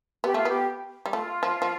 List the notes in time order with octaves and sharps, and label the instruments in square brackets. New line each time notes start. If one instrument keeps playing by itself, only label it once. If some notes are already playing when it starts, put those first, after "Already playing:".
[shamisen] B3 [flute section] G4
[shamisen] A3 [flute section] F4
[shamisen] B3 [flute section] G4
[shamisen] G3
[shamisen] A3 [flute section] F4
[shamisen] F3
F3